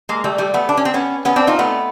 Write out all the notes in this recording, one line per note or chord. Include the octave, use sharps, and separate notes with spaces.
G#3 A#3
G3 A3
G3 A3
A3 B3
D4
C#4
C4
B3 C#4
B3 C#4
C4 D4
D#4 F4
A3 B3